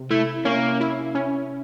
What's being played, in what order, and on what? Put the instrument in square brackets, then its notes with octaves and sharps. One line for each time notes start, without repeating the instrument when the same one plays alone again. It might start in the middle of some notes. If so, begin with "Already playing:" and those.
Already playing: [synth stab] C3
[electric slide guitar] A3 [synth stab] E4
[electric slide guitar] A#3 [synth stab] C#4
[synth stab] E4
C#4